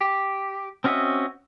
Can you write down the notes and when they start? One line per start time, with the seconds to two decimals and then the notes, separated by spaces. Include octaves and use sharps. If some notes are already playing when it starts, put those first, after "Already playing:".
0.01 G4
0.84 C4 C#4 F#4 D#5 E5